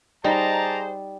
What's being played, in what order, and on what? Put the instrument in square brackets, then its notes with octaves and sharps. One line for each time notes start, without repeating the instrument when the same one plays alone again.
[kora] G3 [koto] D#4 [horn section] G#4 C5 [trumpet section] D5 A5 A#5